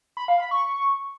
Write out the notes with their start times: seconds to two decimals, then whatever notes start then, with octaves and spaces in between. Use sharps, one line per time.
0.17 B5
0.28 F5
0.40 B5
0.51 C#6